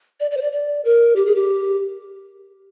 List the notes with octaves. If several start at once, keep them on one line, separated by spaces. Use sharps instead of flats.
D5
D5
C5
D5
D5
A#4
G4
G#4
G4